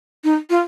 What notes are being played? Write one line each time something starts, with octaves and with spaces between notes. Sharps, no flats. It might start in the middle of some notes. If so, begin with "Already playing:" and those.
D#4
F4